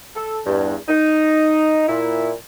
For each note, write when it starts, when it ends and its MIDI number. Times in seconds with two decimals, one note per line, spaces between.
0.16 0.40 69
0.46 0.75 40
0.46 0.75 43
0.89 1.83 63
1.88 2.32 46
1.88 2.32 64